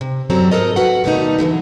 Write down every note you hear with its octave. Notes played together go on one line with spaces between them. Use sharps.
C3
F#2 F#3 G3 C4 A4 A#5
G#2 A4 A#4 D#5
F#4 B4 F#5
B2 D#3 G3 A3 A#3 D#4
D3 E3 F#3 A3